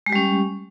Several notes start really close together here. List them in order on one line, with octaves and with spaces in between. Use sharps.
G#3 G4 G3 C#4